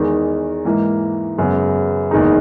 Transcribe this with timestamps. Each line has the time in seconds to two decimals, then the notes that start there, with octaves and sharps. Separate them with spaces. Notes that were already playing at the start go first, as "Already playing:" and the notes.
Already playing: E2 D#3 G#3 D#4
0.65 G#2 E3 A#3
1.38 F#2 C#3 G#3 B3
2.11 F#1 E2 D#3 G#3 D#4